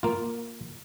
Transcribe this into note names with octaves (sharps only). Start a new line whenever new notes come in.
A#3 F4